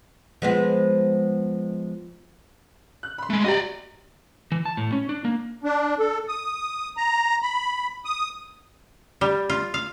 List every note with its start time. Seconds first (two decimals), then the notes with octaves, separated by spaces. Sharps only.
0.42 F3 G#3 B3
3.03 F#6
3.18 B5 C6
3.30 G#3 A3
3.44 F#4 G4 D5 D#5 A#5
4.52 E3
4.65 A5
4.77 A2
4.92 C#4
5.09 D4
5.25 A#3
5.64 D4
5.99 A4
6.28 D#6
6.97 A#5
7.42 B5
8.05 D#6
9.21 G3
9.50 F4
9.74 F5